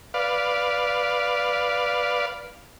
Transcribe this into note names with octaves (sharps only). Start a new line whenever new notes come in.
B4 D5 F5